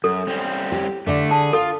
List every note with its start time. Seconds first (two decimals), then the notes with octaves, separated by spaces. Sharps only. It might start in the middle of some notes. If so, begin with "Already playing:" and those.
0.04 F#2 A4
0.27 G3 C4 C#4
0.72 G4
1.07 D3 A3 A4 D5
1.31 G#4 A5
1.53 F4 A4